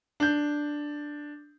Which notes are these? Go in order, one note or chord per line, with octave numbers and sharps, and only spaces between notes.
D4 G6